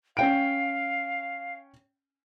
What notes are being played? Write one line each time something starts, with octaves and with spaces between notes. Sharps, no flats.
C#4 F5 G5 D7